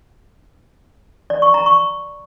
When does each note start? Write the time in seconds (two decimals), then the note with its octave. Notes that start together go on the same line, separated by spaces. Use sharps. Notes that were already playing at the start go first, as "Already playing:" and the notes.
1.30 D5
1.42 C#6
1.54 A#5
1.66 C#6